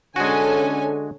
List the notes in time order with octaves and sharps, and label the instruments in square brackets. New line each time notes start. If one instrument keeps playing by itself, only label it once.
[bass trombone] D3 [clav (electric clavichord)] G#3 F#4 [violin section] C#4 A4 G#5